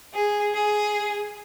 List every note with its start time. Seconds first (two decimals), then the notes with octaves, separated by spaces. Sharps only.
0.12 G#4
0.54 G#4